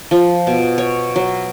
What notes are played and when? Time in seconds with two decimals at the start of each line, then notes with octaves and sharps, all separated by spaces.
0.11 F3
0.47 B2
0.78 C#5
1.16 F#3